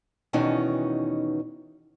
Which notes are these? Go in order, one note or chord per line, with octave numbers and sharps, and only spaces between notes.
E2 B2 D#3 E3 C#4 D#4